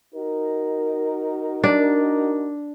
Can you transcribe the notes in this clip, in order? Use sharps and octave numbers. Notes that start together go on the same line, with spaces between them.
D#4 F#4 A#4
D4